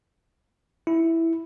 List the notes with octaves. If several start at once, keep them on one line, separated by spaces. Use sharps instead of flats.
E4